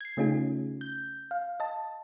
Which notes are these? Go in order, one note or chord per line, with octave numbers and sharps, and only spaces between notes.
G#6 C7
C#3 A3 C#4 D#4 F4 G#4
G6
F5
D#5 A5